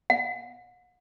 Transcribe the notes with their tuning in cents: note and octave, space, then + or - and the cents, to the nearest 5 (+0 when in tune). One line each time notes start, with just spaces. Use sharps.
F#5 -40